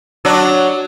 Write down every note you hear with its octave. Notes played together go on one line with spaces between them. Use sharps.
F#3 D4